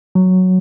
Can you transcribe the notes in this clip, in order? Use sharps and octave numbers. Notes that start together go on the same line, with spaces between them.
F#3